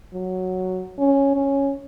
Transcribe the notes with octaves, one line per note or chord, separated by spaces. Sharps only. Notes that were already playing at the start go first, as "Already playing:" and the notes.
F#3
C#4
C#4